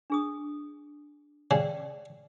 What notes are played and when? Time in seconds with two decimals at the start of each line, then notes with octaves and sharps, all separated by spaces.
0.10 D4 G#4 D#6
1.51 C#3 D5 G5